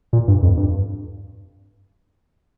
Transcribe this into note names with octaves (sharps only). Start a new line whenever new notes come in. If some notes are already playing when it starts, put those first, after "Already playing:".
A#2
G2
F2
G2